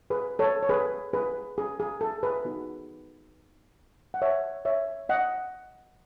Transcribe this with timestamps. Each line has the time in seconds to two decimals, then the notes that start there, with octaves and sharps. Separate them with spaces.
0.10 G#4 B4
0.39 A4 C#5
0.63 C#5
0.69 G#4 B4
1.13 G#4 B4
1.58 G#4
1.80 G#4
2.01 A4
2.23 G#4 B4
2.45 B3 D#4 F#4
4.14 F#5
4.22 C#5 E5
4.65 C#5 E5
5.09 D#5 F#5